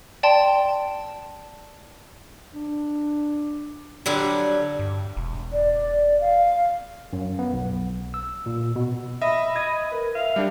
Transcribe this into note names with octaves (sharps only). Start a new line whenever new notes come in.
D5 G5 A5 C6
D4
D3 F#3 G3 D4
G2
E1
D5
F5
F#2
B3
B1
E6
A#2
B2
D#5 E5 B5
D#5 G#6
A#4 B4
E5 F5
G3 D4 G4